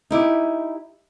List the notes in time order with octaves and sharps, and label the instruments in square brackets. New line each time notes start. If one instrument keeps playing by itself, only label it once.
[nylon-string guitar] D#4 E4 G4